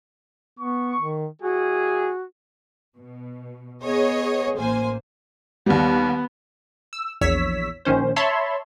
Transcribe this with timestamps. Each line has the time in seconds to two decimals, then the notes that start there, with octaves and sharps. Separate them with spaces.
0.59 B3 C#6
1.00 D#3
1.42 G3 E4 F#4 G#4
2.98 B2
3.84 B3 G#4 C#5 D#5
4.59 A1 A#3 C5 G#5
5.66 D#2 G3 B3
6.93 E6
7.21 A#1 E2 C#5 E6 B6
7.85 A#1 D#3 C#4 C5
8.16 C#5 E5 A5 B5 C6